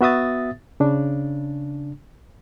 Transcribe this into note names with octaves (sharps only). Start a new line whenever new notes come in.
B3 F#4 E5 D#6 A6
C#3 D4